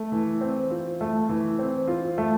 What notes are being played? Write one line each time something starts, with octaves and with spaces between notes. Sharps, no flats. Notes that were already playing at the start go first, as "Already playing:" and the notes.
Already playing: A3
E3
C4
F4
A3
E3
C4
F4
A3